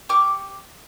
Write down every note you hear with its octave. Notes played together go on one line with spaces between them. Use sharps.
G4 C#6 D6 F6